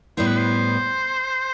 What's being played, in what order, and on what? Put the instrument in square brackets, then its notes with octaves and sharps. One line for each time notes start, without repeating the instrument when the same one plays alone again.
[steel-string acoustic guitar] A2 G3 B3 E4 [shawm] C5
[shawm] B4
C5